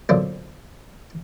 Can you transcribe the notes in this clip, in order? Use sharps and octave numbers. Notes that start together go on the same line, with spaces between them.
B1 F#2 A#2 D3 F4 C5